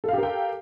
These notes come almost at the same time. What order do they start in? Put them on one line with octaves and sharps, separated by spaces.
A4 F5 G4 A#4 G5